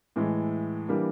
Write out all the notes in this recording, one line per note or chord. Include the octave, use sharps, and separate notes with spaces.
A2 E3 G#3
E3 G3 A#3 D4